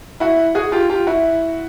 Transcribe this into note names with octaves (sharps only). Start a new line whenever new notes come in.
E4 F#4
F#4 G#4
F4 G4
F4 G4
E4 F#4